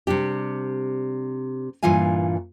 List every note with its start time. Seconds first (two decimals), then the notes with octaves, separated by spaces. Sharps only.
0.07 C3 G3 D4 G4
1.83 G2 A#2 E3 F4 F5 G#5